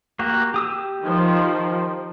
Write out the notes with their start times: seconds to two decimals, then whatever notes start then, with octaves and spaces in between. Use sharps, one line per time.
0.19 A#3 F#4 G4
0.54 G4 D#6 E6
1.05 D#3 F3